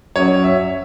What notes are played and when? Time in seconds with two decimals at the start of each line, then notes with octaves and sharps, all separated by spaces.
0.16 F#2 F#3 C#4 C#5
0.44 E5